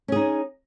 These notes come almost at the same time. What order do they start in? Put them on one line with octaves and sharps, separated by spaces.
C#4 G#4 D#4